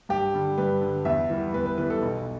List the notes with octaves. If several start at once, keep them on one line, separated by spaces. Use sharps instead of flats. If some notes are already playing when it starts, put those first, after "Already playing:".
G2 G4
D3 G3
G2 B4
D3 G3
E2 E5
E3 G3 B3
E2 B4
B4
E3 G3 B3 B4
A4
B1